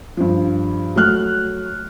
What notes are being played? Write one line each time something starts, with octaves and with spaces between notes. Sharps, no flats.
G2 F3
F#3 A3 F6 F#6